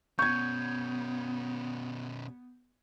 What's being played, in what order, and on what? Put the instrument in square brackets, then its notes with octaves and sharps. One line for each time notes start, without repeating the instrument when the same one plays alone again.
[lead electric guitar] B2 C#4 [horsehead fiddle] B3 [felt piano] C#6 G#6 [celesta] G6